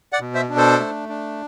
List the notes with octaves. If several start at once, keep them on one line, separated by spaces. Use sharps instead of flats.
D5 F#5
B2
C5 E5
D4
A4 C5
A3
D4